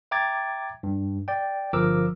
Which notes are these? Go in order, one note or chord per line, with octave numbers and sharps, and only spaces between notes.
E5 G5 A#5 D6 G#6 A6
G2
D5 G5
G1 F3 A#4 D6 E6